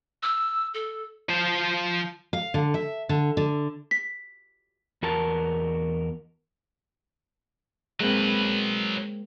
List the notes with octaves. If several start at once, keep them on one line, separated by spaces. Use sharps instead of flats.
E6
A4
F3 C5
F5
D3
E5
D3
D3
B6
E2 F#4 A#4 A5
F#3 G#3 A#3 C4 B4